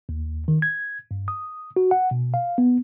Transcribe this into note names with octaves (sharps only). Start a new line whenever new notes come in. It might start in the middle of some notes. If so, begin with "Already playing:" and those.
D#2
D#3
G#6
G2
D#6
F#4
F#5
B2
F5
B3